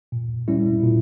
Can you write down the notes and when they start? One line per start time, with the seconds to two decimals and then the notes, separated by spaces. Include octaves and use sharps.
0.12 A#2
0.48 G3 C#4 E4
0.83 A#2